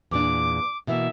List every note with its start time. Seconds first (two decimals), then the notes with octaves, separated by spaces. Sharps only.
0.11 E2 A#2 D4 D6
0.87 B2 E3 A#3 E5